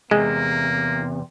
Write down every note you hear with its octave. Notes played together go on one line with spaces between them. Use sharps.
E2 C3 G#3 A#3